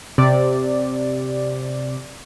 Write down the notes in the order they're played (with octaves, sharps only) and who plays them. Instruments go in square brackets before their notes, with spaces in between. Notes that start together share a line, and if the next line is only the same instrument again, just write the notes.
[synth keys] C3 D5